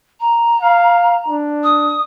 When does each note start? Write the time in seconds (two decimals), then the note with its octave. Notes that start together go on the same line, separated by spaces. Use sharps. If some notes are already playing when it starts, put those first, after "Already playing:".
0.20 A#5
0.61 F5
1.28 D4
1.63 D#6